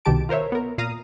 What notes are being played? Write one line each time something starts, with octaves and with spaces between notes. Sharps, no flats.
C2 B2 D#3 G4 A5 D7
F4 A#4 C5 C#5 E5
B3 A#4
A#2 F5 A#5 D#6